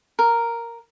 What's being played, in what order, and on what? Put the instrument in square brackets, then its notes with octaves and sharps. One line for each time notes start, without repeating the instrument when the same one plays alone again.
[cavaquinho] A#4